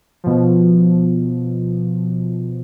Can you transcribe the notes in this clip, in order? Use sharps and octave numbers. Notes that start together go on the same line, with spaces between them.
B2 F3